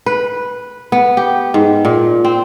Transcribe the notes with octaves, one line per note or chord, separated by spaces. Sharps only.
B4
B3
G4
G#2
A#2
C4